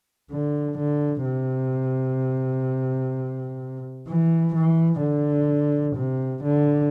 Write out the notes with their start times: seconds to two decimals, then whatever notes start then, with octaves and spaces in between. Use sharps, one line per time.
0.32 D3
0.78 D3
1.25 C3
4.08 E3
4.55 E3
5.01 D3
5.96 C3
6.44 D3